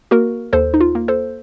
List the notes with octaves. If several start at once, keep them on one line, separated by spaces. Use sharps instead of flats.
A#3 F#4 A#4
D#2 A4 C5
D#4
F4
A#3
A4 C5